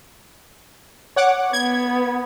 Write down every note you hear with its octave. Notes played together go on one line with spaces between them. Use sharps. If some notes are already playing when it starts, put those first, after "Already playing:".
C#5 F#5 D6
B3 G#6